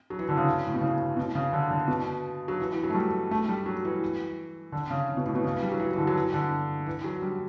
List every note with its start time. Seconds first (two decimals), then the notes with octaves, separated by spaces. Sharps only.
0.10 F#3
0.19 E3
0.29 D3
0.37 C#3
0.67 A2
0.74 B2
0.81 C#3
1.17 B2
1.35 C#3
1.53 D3
1.71 D3
1.88 B2
2.48 F#3
2.60 E3
2.71 E3
2.83 F#3
2.90 A3
2.95 G3
3.31 A3
3.49 G3
3.66 F#3
3.85 E3
4.72 D3
4.90 C#3
5.09 C#3
5.17 B2
5.26 A2
5.35 B2
5.45 C#3
5.54 E3
5.63 G3
5.72 F#3
5.80 E3
5.93 E3
5.98 D3
6.07 F#3
6.16 E3
6.34 D3
6.86 E3
7.04 F#3
7.22 G3